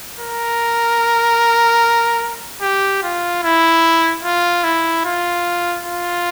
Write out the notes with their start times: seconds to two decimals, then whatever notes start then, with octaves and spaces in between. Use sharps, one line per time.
0.20 A#4
2.62 G4
3.03 F4
3.43 E4
4.24 F4
4.64 E4
5.05 F4
5.85 F4